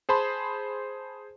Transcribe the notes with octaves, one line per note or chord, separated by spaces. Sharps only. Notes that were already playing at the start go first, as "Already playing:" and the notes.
G#4 C5 A5 B5 C6